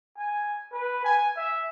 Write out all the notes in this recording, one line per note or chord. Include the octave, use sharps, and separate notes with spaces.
G#5
B4
G#5
E5